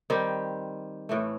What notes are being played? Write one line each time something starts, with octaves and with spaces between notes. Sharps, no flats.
D#3 G3 C4
A2 E3 A3